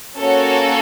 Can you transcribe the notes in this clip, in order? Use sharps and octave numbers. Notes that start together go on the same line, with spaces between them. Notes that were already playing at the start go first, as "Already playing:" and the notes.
A#3 C#4 F#4 A4 C#5